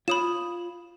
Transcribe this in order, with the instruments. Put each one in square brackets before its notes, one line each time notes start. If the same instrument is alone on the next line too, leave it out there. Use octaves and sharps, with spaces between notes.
[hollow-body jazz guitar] F4 C#5 [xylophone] B5 D#6 E7